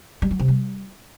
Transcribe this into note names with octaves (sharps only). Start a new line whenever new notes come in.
G3
F#3
C3
G3